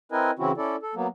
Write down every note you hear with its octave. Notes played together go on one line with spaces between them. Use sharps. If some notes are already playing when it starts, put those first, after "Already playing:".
C4 E4 A#4 B4 D#5 G#5
C#3 E3 C4 C#4 E4 F#4
C#4 E4 A4 D5
A4
F#3 A#3 B3